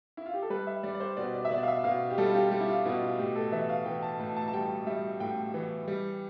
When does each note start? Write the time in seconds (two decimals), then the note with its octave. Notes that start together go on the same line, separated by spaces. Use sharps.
0.17 E4
0.26 F4
0.34 G4
0.42 A4
0.50 G3 B4
0.67 E5
0.83 G3 D5
0.95 D5
1.00 C5
1.17 B2 D5
1.34 D5
1.45 E5
1.51 B2 D5
1.63 F5
1.68 E5
1.84 B2 F5
2.10 G4
2.18 G3 A4
2.29 F4
2.35 G4
2.51 G3 G4
2.60 E4
2.69 F4
2.85 B2 E4
3.02 F4
3.19 A2 G4
3.36 A4
3.52 E3 E5
3.69 F5
3.86 E3 G5
4.03 A5
4.19 A2 A5
4.37 A5
4.48 A5
4.53 G3 G5
4.87 G3 E5
5.20 A2 G5
5.54 E3
5.88 G3